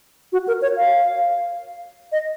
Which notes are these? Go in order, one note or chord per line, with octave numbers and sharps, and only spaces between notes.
F#4
A#4
C#5
F5
D#5